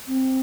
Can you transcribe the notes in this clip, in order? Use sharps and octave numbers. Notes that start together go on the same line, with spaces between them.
C4